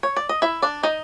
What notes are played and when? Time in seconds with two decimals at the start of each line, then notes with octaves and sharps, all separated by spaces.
0.03 C#5
0.16 D5
0.29 D#5
0.42 E4 E5
0.62 D4 D5
0.83 D#4 D#5